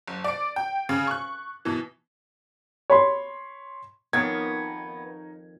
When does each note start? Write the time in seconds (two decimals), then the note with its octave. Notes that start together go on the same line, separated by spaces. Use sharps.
0.08 F#1
0.24 D5 D7
0.56 G5
0.89 C#3
1.07 C#6 F#6
1.65 B2 E3
2.90 C#5 B5 C6
4.13 F2 D#3 B3 D#4 A#4 C#5 G#6